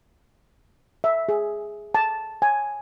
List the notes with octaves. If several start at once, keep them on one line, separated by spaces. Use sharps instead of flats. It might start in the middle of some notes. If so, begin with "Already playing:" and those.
E5
G#4
A5
G#5